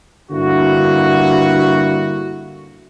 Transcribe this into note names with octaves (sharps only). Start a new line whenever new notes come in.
G2 D3 A#3 E4 F#4